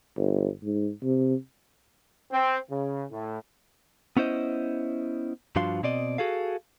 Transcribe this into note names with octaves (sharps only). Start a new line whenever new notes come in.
G1
G#2
C3
C4
C#3
A2
B3 C#4 E4 C5 D#5
G2 F3 D4 F#4 F5 C6
B2 C4 D5 D#5
F#4 G#4 A4 F5